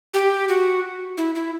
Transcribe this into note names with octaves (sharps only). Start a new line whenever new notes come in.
G4
F#4
E4
E4